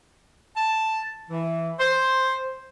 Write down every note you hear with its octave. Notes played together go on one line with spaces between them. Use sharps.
A5
E3
C5